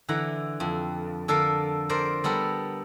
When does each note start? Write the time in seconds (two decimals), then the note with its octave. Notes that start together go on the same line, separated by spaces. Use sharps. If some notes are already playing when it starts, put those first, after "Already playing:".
0.08 D3 E3 F#5 A#5
0.60 F2
1.28 D3 A4 A#4 F5
1.89 A#4 C5 D5
2.24 G3 B3 A4 A#4